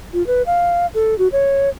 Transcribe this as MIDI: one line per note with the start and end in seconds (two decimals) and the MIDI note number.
0.14 0.25 65
0.27 0.42 71
0.46 0.86 77
0.94 1.17 69
1.18 1.28 66
1.32 1.69 73